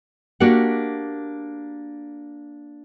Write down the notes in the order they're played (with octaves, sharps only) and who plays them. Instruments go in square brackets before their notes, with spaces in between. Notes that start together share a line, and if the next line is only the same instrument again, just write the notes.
[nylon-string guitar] A#3 D4 F#4 G4 A#4 F#5